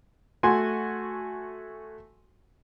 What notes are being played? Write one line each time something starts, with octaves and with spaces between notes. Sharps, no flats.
A3 F#4 G#5 C6